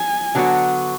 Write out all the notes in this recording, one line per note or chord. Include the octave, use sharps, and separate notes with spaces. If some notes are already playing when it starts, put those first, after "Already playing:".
Already playing: G#5
D3 F#3 B3 F#4